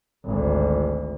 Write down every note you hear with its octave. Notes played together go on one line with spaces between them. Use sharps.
G#1 D2